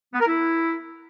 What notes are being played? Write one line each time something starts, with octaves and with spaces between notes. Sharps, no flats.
B3
A#4
E4